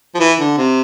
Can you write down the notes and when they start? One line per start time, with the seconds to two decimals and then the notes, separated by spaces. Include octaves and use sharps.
0.15 F3
0.20 E3
0.40 D3
0.58 C3